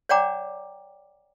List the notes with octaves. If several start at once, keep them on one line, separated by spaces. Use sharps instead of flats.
C#5 D5 F#5 G5 A#5 D6